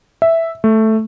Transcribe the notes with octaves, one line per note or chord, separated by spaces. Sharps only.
E5
A3